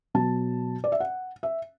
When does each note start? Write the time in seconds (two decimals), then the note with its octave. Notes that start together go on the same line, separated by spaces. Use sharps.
0.14 B2 F#3 A5
0.84 D5
0.92 E5
1.00 F#5
1.43 E5